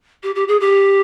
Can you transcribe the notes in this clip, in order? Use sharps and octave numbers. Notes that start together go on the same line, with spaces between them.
G4
G4
G#4
G4